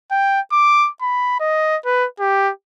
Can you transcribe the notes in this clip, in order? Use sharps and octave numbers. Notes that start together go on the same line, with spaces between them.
G5
D6
B5
D#5
B4
G4